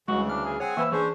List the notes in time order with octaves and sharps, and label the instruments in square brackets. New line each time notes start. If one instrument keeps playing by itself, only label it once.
[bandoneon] D2 C#3 E3 [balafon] G3 C#6 [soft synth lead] G#3 [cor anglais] F#4
[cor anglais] D4 [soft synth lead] F6
[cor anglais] G#4
[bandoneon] C4 F#5 G#5 [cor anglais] G#4 [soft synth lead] C#5
[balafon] E3 B4 B5 [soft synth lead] A#3 [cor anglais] E5
[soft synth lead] E3 [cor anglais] C#4 [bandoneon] D4 C5 [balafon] G#4